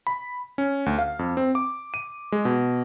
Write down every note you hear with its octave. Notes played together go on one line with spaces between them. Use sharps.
B5
C#4
D2
F5
F2
C4
D6
D#7
G#3
B2